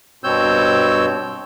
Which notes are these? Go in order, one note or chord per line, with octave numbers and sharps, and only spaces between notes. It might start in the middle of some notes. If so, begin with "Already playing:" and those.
G2 B2 C4 C#5 E6 G6